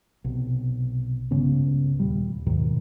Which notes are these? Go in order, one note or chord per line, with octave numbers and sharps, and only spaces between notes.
B1 C3
C#2 G2 C#3 B3
D#2 A#2 G3
D#2 G#2 B2 D#3